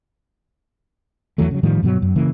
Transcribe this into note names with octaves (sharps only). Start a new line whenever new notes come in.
E2 E3 F#3 A3
C#3 F#3
A2 D#3 F3 G3
G2 B2 F3 F#3
F#2
C#3 E3 A#3